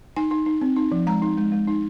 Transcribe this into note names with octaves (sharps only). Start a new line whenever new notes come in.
D#4 G#5
D#4
D#4
C4
D#4
F3
G#3 A#5
D#4
G#3
G#3
D#4